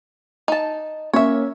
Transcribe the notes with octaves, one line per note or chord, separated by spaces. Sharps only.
D#4 A5
A#3 C#4 C#5 E5